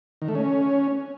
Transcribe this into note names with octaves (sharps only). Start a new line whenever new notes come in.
D#3
A3
C#4